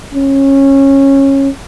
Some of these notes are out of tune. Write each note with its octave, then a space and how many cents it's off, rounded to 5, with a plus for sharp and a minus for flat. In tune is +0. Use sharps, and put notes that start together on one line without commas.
C#4 -20